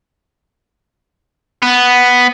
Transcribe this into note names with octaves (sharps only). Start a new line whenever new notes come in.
B3